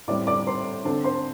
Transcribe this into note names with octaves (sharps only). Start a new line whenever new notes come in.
A2 G3 C4 D5 D6
D5 D6
C5 C6
D3 C4 A4 A5
C5 C6